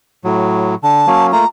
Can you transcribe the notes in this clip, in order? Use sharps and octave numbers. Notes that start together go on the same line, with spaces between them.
A2 F#3
D3 A5
F#3 A#3 C#4
A3 A#3 F4 A#5